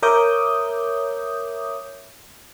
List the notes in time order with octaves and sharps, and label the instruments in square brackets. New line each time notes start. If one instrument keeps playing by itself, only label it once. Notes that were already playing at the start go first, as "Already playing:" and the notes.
[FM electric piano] A#4 C#5 E5 D6 D#6 G6